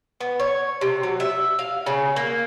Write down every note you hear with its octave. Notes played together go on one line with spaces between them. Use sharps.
B3
C#5
C3
F#3
E5
F5
C#3
A#3